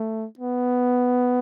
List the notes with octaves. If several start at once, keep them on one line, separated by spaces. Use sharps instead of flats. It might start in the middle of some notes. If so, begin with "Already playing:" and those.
Already playing: A3
B3